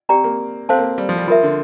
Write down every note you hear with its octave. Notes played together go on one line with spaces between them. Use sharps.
C4 G4 D5 G5 A#5
A#3
C4 A4 C5 F5 A5
A#3
G3
F3
G3
F3 F4 A#4 E5
D3